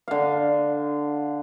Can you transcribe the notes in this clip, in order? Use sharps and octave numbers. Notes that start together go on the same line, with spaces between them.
D3 F5